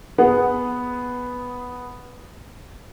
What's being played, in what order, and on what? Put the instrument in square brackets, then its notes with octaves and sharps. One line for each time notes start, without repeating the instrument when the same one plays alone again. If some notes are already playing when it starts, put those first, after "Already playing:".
[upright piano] B3 G#4 F#5